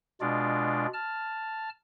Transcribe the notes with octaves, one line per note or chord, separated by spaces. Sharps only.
B2 G#3 D4 F4 D5
A5 F6